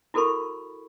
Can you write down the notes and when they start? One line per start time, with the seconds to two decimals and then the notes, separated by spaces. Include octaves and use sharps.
0.14 E4 F#4 A4 A#4 B5 C#6